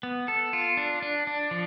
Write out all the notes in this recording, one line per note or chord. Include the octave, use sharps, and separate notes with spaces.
B3
A4
F4
D4
D4
D4
F3